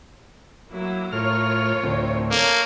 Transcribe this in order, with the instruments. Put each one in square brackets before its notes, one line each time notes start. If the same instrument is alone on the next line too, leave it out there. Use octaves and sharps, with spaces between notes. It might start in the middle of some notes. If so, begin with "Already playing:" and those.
[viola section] F#3 A#3 E4
[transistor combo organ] A2 F6 [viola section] F4 A#4 C#5
[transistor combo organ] D2 A2 C4
[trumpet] A#3 [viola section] A4 C#5